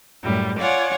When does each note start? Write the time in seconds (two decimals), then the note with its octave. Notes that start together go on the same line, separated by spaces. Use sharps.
0.23 F#2 A2 G3
0.60 F4 C#5 D5 F#5 G#5